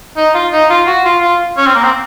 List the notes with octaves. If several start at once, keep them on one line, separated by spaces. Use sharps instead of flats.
D#4
F4
D#4
F4
F#4
F4
F4
C#4
C4
A#3
C4